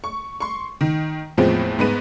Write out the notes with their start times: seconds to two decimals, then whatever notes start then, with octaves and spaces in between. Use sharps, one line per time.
0.04 C#6
0.40 C6 C#6
0.81 D#3
1.37 E2 A2 F3 G#3 B3 C4
1.79 G#2 G#3 B3 B4 D#7